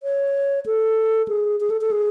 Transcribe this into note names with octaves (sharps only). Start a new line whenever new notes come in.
C#5
A4
G#4
G#4
A4
A4
G#4